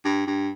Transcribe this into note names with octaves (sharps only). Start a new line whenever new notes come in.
G2
G2